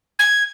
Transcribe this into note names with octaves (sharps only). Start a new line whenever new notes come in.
G#6